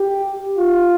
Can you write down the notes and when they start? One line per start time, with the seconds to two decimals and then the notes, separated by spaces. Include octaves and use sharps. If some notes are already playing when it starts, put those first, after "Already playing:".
Already playing: G4
0.58 F4